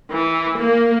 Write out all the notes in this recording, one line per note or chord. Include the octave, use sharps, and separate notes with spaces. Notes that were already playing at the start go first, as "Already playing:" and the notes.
E3
A#3